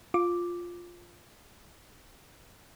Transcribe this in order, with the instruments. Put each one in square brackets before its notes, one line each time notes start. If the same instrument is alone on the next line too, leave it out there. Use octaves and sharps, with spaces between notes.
[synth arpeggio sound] F4 D6